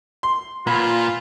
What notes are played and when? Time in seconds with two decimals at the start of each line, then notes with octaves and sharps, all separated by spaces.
0.23 C6
0.67 A#2 F4 B5